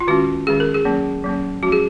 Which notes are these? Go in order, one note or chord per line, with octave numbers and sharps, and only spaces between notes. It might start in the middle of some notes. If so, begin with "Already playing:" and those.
F4
D#3 G#3 C#4 F#4
D#3 G#3 C#4 G#4
A#4
G#4
F#3 A#3 C#4
F#3 A#3 C#4
F3 G#3 C#4 F#4
G#4